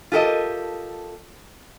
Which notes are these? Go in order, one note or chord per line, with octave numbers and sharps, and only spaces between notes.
F4 G4 A4 A#4 D#5